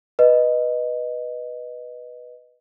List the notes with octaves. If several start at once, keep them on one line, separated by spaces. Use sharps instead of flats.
B4 D#5